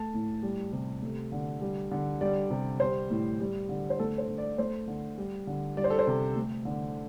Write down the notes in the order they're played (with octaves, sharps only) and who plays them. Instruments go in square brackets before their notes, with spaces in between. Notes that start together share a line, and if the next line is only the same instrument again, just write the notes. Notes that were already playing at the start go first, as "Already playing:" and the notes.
Already playing: [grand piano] A3 A5
A2
G3
C3
A3
D3
G3
D3
G3 D5
C3
G3 C5
A2
G3
D3
C5
A3 A4
C5
D3
D5
A3 C5
D3
G3
D3
G3 D5
C5
A4
C5
C3
A3
D3